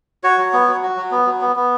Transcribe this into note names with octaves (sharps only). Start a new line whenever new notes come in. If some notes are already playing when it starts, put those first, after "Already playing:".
F#4 C#5
F#3
B3
F#3
F#4
F#3
B3
F#3
B3
B3